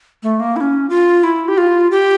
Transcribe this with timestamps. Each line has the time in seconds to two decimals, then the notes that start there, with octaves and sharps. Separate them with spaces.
0.23 A3
0.40 A#3
0.56 E4
0.61 C#4
0.90 F4
1.24 E4
1.48 G4
1.58 F4
1.91 G4